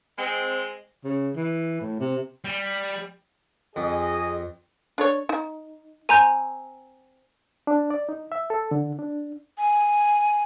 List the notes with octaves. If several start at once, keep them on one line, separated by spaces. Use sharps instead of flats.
G#3 C4
C#3
E3
A2
C3
G3
F2 G#4 D#5
D4 A4 C#5
D#4
C4 G#5 A#5 G6
D4
D5
D#4
E5
A4
D3
D4
G#5